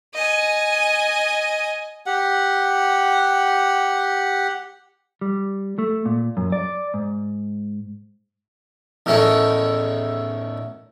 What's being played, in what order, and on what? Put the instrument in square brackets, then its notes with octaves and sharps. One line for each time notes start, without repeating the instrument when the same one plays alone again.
[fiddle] D#5 G#5
[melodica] G4 F#5
[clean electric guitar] G3
A3
A#2
F#2
D5
G#2
[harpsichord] E2 A2 D#3 A3 C#4